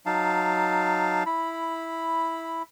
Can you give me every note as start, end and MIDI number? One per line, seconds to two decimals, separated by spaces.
0.06 1.23 54
0.06 1.23 63
0.06 1.23 77
0.06 1.23 81
1.26 2.63 64
1.26 2.63 83